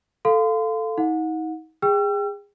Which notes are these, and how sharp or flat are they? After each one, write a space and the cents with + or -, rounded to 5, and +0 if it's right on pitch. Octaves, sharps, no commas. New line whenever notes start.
A4 +0 F5 +0 C6 -35
D#4 +35 F#5 -30
G#4 -30 G5 +0 E6 +45